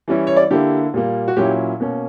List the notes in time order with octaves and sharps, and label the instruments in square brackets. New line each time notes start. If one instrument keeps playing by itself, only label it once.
[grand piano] E3 G3 C#4 E4
C#5
D5
D3 A#3 E4 G4
A#2 G3 A#3
F#4
A#2 F#3 C#4 E4 G4
B2 A#3 C#4